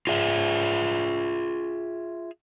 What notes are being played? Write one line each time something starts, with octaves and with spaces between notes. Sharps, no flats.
F4 G#4 E5